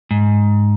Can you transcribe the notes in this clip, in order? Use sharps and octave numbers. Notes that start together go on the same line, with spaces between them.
G#2